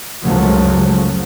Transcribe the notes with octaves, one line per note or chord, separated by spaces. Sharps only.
C#2 F#2 F3 F#3 A3